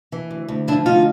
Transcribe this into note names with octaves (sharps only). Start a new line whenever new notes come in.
E3
D2
D2
F3 D4 E4
D2 D#4 F4